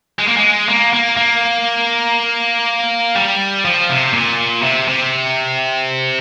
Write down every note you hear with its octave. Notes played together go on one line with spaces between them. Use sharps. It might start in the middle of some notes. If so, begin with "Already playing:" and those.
G#3
A#3
G#3
A#3
A#3
A#3
G3
F3
C3
A#2
C3
C3